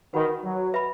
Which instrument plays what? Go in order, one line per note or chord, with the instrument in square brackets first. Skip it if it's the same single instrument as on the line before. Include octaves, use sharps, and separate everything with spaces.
[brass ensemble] D#3 [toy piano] F#4 B4 F#5 B5
[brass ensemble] F#3
[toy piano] B4 E5 B5